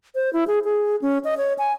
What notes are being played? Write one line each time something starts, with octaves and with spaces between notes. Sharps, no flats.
C5
E4
G#4
G#4
C#4
D#5
C#5
G#5